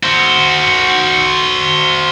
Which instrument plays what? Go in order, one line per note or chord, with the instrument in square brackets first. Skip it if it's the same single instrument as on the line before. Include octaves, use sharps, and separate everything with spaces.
[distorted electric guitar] F#4 C5